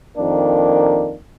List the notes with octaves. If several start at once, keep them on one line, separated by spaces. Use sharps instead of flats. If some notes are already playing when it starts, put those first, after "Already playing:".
F2 D#3 A#3 D4